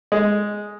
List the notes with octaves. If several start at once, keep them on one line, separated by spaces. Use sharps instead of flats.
G#3